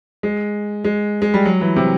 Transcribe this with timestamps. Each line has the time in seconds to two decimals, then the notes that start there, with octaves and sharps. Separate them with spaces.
0.23 G#3
0.84 G#3
1.22 G#3
1.34 G3
1.45 F#3
1.61 E3
1.76 C3